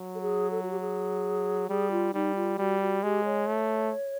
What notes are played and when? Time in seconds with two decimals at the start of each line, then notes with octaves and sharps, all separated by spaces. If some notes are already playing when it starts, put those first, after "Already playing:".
Already playing: F#3
0.15 A4
0.21 G#4
0.51 A4
0.63 F#4
0.71 G4
0.80 G#4
1.69 G3 G#4
1.91 F4
2.14 G3 D#4
2.35 F4
2.58 G3 F#4
2.81 F#4
3.03 G#3 G4
3.25 C#5
3.47 A3